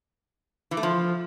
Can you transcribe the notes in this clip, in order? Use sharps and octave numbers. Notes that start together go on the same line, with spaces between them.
E3
A3
F3